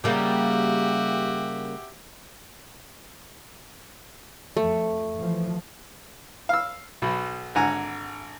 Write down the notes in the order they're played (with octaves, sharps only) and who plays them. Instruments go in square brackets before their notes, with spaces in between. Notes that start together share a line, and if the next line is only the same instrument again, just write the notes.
[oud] C#3 G3 A#3 [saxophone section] F#4 G4 E5
[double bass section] F2 [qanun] A3
[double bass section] E3 F3
[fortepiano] F5 E6
B1 B2
G#1 D3 F#5 G#5 A#5